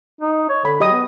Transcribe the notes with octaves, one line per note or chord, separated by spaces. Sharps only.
D#4
C#5
D3 B5
F#3 G4 D#5 D#6
B3